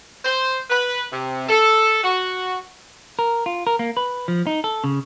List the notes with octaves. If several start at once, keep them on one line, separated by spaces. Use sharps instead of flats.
C5
B4
C3
A4
F#4
A#4
F4
A#4
A#3
B4
F3
D#4
A4
C#3